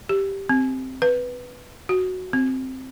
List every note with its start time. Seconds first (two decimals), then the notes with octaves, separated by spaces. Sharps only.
0.09 G4
0.49 C4
1.02 B4
1.89 F#4
2.33 C4